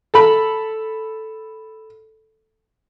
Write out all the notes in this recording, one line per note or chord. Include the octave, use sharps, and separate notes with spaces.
A4 B5